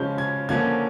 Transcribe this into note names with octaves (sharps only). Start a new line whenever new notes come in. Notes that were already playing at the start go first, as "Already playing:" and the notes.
Already playing: C#3 F3 G#3 C#4 G6
G#6
D3 F3 A#3 C#4 G#6